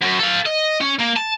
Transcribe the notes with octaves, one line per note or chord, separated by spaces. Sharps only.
F#2
A4 F5
D#5
C#4
A#3
A5